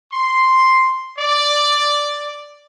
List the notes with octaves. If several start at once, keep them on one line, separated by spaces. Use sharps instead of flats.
C6
D5